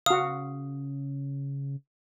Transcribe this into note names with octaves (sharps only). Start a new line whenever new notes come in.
C#3 F#4 F5 D#6